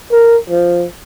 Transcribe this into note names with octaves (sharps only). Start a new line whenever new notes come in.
A#4
F3